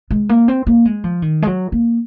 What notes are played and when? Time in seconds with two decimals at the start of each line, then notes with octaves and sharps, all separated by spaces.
0.11 G#3
0.29 A#3
0.48 C4
0.67 A#3
0.85 G#3
1.04 F3
1.22 D#3
1.42 G#3
1.47 F#3
1.72 A#3